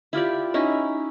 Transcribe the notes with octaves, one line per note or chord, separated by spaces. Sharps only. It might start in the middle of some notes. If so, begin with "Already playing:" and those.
E4 F4 G4 D5
C#4 D#4 E4